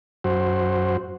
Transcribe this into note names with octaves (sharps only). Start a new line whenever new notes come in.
F#2 F#4 C5